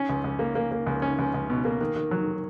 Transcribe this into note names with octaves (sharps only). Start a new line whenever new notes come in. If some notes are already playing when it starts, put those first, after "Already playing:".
Already playing: C#4
C#2
C#2
A#3
A#3
A#3
C#2
C#4
C#2
C#2
B2
A#3
D#3
D#3
F#3